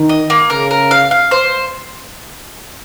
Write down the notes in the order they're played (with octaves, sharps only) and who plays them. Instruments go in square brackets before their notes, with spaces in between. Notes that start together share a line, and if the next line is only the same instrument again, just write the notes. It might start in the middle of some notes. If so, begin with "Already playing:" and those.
Already playing: [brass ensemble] D#3
[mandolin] D#5
A#3
[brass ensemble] C#3 [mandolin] A#4
[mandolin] A#4
F5
F5
C5